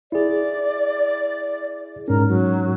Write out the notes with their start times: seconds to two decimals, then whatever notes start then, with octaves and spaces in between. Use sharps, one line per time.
0.12 E4 G#4 D5
2.08 G#2 C#4 A#4
2.28 F#3